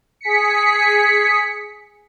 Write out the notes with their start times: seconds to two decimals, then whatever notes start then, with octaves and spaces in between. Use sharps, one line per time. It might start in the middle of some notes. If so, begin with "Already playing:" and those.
0.21 G#4 B6 C#7